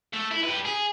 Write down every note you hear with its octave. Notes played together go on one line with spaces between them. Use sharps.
A3
E4
G4 B4
G#4